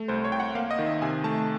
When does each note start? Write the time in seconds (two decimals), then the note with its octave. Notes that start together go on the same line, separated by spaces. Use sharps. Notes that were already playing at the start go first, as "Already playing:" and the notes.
Already playing: A3
0.08 C2 C5
0.25 C#5
0.32 C2 G5
0.40 F#5
0.55 A#3 F5
0.71 D#5
0.79 D#3
0.86 E5
1.02 C3 G#5
1.24 A3 A5